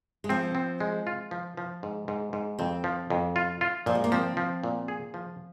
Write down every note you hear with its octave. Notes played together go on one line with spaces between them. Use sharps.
G#3
F3 C4
C4
G#3
F4
F3
F3
G#2
G#2
G#2
F2 C4
F3
F2
F4
F4
A#2 F3
G#3
A#3
F3 C4
F3
A#2
G#4
F3